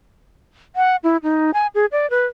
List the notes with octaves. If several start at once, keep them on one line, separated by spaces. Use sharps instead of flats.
F#5
E4
D#4
G#5
G#4
D5
B4